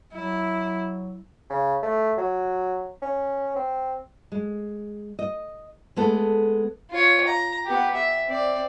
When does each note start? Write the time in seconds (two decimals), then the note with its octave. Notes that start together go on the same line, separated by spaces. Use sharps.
0.14 F#3 E4
1.50 C#3
1.83 A3
2.18 F#3
3.02 C#4
3.56 C4
4.32 G#3
5.19 D#5
5.96 G#3 A3 B3 A4
6.90 F4 C#5
7.27 A#5
7.66 B3 G4
7.94 E5
8.27 C4 D5